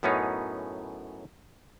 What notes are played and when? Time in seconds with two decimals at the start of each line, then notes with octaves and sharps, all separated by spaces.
0.03 F#2 A2 B3 C#4 D#4